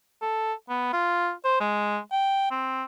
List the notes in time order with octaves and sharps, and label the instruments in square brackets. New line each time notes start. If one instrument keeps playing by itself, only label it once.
[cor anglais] A4
B3
F4
C5
G#3
G5
C4